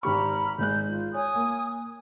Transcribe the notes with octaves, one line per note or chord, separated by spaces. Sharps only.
G#1 G4 A#5 B5 C#6 F6
G#1 G#3 F#6 G6
F4
C#5 G#5 D#6
A#3